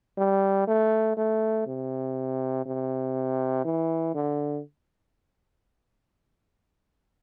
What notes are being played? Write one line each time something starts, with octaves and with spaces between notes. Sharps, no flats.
G3
A3
A3
C3
C3
E3
D3